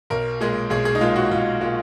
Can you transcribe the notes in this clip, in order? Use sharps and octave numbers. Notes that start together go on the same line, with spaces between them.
B1 A#4
A#2 G#3 G#4
B1 G#4
G#4
D#4
A#2 G#3 F4
F#4
B1 F4
A#2 G#3 F4